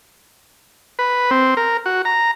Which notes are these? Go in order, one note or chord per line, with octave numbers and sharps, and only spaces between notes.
B4
C4
A#4
F#4
A#5